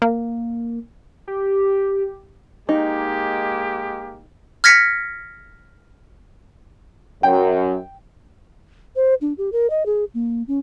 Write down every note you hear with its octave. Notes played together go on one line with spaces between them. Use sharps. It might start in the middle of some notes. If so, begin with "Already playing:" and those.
A#3
G4
G#3 A#3 D#4 G4
F6 G#6 A#6 B6 C#7
F#2 G5
C5
D4
G4
A#4
D#5
G#4
A#3
C#4